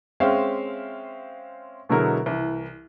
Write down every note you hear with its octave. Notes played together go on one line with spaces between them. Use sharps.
G#3 C4 C#4 E5 F5 G5
B2 D3 F#3 G#3 E4 A#4
C2 E3